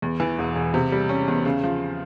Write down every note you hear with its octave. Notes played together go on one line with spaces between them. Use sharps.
E2
E3
E1
E1
C3
G3
C#4
E2
C#3
F3